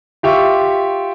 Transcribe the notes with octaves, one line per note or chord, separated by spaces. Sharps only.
F4 G4 E5 C#6